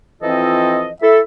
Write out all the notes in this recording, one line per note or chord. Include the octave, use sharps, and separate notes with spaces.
E3 F3 C4 F4 A4 D#5
E4 A4 E5